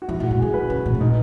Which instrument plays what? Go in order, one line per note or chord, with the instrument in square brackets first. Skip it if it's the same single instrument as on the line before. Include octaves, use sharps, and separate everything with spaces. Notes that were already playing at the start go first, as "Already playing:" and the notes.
[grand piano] F#4
[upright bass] E3 [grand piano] E4
[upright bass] A#2
[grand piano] F#4
[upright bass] A#2
[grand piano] G#4
[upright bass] C#3
[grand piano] B4
[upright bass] C#3
A#2
B2
[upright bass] A#2 [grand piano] D#4